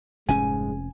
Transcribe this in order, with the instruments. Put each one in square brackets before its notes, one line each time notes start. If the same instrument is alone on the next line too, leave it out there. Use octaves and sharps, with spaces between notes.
[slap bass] F1 F2 C#4 [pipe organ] G#2 G#3 [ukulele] G#5